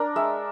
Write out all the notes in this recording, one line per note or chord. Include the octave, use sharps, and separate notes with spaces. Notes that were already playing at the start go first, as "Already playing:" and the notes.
Already playing: D4 A#4
G#3 E5